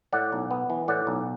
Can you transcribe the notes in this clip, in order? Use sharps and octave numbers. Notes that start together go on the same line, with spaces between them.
A2 D5 F#5
B1
B3
E3
A2 D5 F#5
B1